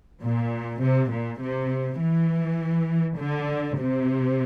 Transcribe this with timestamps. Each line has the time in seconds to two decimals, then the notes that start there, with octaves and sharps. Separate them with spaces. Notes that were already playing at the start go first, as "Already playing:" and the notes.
0.23 A#2
0.82 C3
1.12 A#2
1.42 C3
2.00 E3
3.19 D3
3.78 C3